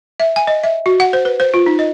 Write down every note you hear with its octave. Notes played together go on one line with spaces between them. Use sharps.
E5
G#5
D#5
E5
F#4
F#5
C5
B4
C5
F4
D#4
D#5